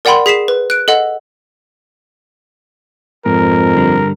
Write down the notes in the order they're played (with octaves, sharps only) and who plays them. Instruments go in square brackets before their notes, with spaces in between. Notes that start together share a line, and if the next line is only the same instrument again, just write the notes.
[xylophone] A#4 D5 F#5 G5 B5 C6
G#4 B6 C7 E7
B4
F#6 D7
A4 D#5 F#5
[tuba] F2 [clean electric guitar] G#2 [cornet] A#4
[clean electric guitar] G2 D3 G3